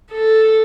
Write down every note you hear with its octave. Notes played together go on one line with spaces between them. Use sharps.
A4